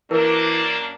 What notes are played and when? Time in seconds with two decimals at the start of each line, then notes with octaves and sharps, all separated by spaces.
0.11 F#2 E3 A#3 D4 A#4